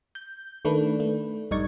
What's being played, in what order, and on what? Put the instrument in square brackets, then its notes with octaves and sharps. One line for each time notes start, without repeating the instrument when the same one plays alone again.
[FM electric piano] G6
D#3 A3 D4 B4
A3
A#1 G2 D#4 D5 C#6 G#6